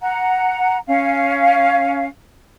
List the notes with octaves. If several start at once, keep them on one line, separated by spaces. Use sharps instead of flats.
F#5 A#5
C#4 F5